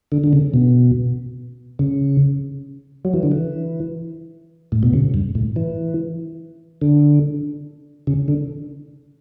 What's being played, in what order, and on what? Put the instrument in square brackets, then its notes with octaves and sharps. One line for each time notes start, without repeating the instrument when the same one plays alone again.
[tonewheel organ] D3
D3
C#3
B2
C#3
F#3
E3
D3
E3
A2
B2
C#3
G2
A2
E3
D3
C#3
D3